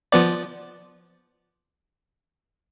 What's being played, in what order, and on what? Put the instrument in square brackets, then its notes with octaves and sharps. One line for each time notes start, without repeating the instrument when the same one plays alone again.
[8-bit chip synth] F3 B3 D5